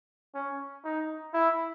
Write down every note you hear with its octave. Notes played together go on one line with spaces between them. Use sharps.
C#4
D#4
E4